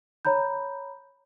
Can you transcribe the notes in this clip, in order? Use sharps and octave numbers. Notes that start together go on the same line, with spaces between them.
C#5 A#5 B5 G6